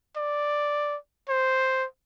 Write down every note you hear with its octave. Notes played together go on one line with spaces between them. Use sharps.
D5
C5